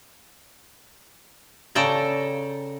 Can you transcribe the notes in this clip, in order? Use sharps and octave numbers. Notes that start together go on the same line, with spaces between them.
C#3 A4 D5 G5 A#5